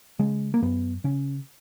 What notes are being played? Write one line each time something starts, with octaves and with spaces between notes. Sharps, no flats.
C#3 G#3
A#3
F#2 B3
C#3 C#4